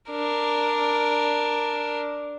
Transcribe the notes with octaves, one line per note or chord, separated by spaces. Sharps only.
D4 A#4